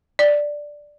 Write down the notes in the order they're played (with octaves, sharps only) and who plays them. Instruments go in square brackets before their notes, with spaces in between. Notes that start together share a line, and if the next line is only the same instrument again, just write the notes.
[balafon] D5